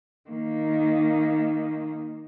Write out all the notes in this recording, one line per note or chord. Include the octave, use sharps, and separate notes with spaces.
D#3 A#3